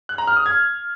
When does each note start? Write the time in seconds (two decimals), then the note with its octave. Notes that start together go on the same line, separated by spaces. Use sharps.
0.09 F#6
0.18 A#5
0.27 F6
0.37 D#6
0.46 G#6